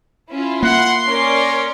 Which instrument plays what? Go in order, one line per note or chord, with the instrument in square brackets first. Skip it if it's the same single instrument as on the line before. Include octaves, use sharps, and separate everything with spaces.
[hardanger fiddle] C#4 [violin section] E4 F4
[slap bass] A#3 [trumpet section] F#5 [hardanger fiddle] C6
[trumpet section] C#4 [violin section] A#4 C#5 D5